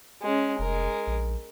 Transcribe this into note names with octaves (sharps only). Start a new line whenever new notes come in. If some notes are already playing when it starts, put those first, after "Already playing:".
G#3 C#4
F1 G#3 A#4
A#1